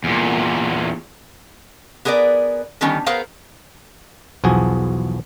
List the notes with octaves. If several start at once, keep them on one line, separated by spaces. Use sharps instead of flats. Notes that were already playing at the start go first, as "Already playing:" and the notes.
E2 A#2
B3 G#4 A#4 B4 D5
D3 D#3 G3 B3 C#4
B3 G#4 A#4 C5 F5 A#5
B1 E2 F3 F#4 G#4 G#5